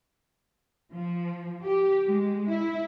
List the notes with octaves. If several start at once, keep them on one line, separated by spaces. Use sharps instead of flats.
F3
G4
G#3
E4